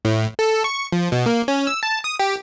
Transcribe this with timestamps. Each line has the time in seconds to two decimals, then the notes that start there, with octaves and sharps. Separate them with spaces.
0.05 A2
0.39 A4
0.64 C#6
0.92 F3
1.12 B2
1.26 A#3
1.48 C#4
1.67 E6
1.83 A5
2.04 D#6
2.19 G4